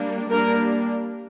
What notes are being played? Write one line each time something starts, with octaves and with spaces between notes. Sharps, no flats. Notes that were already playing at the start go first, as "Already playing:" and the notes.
Already playing: G3 A#3 D4
G3 A#3 D4 A#4